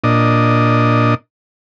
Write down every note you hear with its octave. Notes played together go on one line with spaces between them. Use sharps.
A#2 D4 D#5